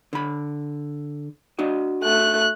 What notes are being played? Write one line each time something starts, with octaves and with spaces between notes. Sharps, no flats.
D3 B5
D4 F#4 D#5
A3 F#6